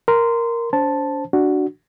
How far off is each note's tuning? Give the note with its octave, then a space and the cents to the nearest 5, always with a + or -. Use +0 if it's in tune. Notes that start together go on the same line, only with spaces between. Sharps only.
A#4 +0 C6 -15
D4 -45 C5 +5 A5 +0
D4 +0 F#4 +5